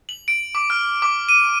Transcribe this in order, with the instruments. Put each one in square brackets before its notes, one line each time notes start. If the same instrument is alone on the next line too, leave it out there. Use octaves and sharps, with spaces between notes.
[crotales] F#7
D7
D6
F6
D6
D#7